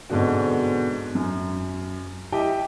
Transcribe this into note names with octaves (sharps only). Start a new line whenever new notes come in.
G#2 B2 D3 C4 F#4
F#2
E4 G4 D#5 G5